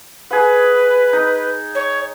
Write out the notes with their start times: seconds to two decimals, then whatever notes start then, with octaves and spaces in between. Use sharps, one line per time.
0.31 G#4 B4 F#5
1.13 D#4
1.75 C#5